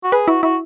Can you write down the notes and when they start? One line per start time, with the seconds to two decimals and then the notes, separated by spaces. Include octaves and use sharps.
0.04 F#4
0.12 G#4 B4
0.28 E4 F#4
0.43 E4 F#4